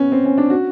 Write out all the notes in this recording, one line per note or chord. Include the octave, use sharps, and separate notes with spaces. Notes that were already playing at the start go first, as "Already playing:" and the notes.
Already playing: B3 C#4
C4
C#4
D4
F#4